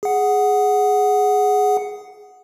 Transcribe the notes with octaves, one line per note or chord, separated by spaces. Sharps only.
G#4 F#5